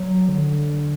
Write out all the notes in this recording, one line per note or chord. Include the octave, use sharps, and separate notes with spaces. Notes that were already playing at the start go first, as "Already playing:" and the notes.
Already playing: F#3
D3